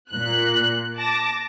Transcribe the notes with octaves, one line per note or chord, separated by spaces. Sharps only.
A#2 F#6
A5 D6 A#6